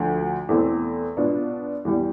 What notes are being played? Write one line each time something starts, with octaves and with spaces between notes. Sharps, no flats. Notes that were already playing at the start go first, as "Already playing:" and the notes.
Already playing: D2 D3 F3
E2 B2 A3 C4
B2 B3 D4 F4
E2 B2 G3